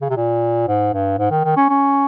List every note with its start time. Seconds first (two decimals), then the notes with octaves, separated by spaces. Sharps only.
0.02 C#3
0.10 C3
0.17 A#2
0.68 G#2
0.93 G2
1.18 G#2
1.31 D#3
1.44 D#3
1.57 C#4
1.69 C#4